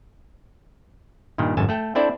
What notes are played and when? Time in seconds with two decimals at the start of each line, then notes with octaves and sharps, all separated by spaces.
1.38 G2 A#2 D#3
1.57 G#1 F#2 A4 G#5 A5
1.69 A3 A4 G5
1.95 C4 D4 E4 A4 C5 D5